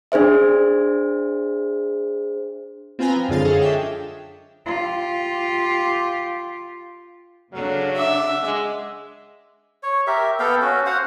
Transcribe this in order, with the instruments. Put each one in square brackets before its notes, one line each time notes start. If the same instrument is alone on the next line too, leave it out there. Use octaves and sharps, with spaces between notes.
[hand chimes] D4 G#4 C5 E5
[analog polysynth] C4 F4 B4 G5 G#5 A#5
F3
F#2 D3 G#3 F4 F5 A6
G#4 A4 C#5 D#5 F5
D4 E5 G5
[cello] F4 G4
[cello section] C#3 D4 [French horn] F#3 [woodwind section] A4 F5
[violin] E5 [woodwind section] F#5 D6
[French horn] G#3
[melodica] C#5
G4 A#4 E5
B3 A4 F5 G5
C#4 F#4
F#4 C5 F5 F#5